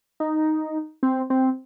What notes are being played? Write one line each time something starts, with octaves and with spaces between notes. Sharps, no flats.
D#4
C4
C4